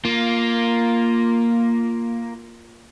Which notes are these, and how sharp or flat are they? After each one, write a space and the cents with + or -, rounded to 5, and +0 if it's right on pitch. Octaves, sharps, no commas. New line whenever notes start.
A#3 +0 F4 +0